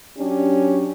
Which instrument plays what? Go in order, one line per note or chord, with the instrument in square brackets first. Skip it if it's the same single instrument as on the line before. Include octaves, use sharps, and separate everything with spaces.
[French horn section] F#3 C#4 D4 G4